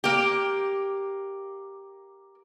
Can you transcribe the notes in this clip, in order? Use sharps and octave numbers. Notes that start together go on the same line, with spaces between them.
A#3 G4